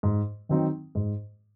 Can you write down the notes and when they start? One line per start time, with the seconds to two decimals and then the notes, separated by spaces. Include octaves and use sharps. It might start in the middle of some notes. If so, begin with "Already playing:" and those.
0.03 G#2
0.49 D#3 F#3 C4 D#4
0.95 G#2